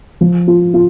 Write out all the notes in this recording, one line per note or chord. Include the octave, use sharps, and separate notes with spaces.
F3
F4
F4